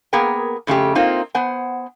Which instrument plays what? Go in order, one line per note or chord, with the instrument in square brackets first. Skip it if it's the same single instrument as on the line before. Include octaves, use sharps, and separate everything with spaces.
[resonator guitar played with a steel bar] A#3 B3 G#4 A#4 G5
F2 C#3 A3 C#4 G4
A#3 C4 D#4 F4
B3 C5 F#5 G#5